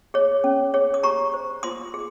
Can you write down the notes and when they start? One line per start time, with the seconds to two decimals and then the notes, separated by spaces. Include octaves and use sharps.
0.14 G#4 C#5
0.44 C#4
0.74 G#4 C#5
0.94 D#6
1.03 G4 A#5 C#6
1.34 C5
1.63 F4 C6 D#6
1.94 G#4